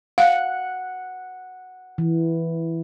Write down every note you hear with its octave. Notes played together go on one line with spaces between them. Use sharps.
F5 F#5
E3